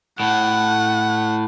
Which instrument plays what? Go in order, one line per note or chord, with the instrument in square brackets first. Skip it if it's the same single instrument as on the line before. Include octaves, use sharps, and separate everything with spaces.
[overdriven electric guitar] A2 [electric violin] F#5